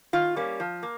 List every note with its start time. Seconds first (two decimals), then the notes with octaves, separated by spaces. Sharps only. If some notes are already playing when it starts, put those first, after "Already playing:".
0.13 D#3 F4
0.36 G3 A#3 C#4
0.60 F3
0.83 A#3